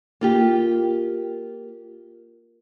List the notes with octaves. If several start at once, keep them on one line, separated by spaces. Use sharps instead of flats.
A#3 F4 G4